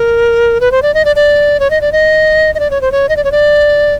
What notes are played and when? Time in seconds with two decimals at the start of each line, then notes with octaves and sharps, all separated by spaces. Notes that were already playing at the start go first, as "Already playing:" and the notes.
Already playing: A#4
0.61 B4
0.72 C5
0.82 D5
0.94 D#5
1.05 D5
1.16 D5
1.60 C#5
1.70 D#5
1.81 D5
1.92 D#5
2.55 D#5
2.60 D5
2.71 C#5
2.81 C5
2.92 C#5
3.09 D#5
3.16 D5
3.24 C#5
3.32 D5